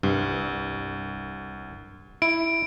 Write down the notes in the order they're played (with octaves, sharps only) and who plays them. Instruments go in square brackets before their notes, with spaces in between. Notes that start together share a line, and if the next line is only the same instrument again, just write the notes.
[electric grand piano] C2 [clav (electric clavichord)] G2
[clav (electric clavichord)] E4 [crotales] D7